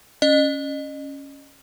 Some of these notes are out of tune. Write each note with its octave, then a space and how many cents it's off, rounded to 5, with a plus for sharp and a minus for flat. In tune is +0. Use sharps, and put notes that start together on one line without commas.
C#4 +0 D#5 -30